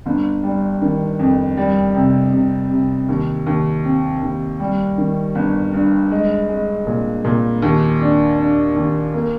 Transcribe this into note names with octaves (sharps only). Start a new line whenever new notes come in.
G1
G3
D#3
F2
G3
C3
C3
C3
D#2
D#2
C4
D#2
G3
D#3
G1
G2
G#3
G#3
A#2
A#2
D#2
D4
D4
D#2
A#3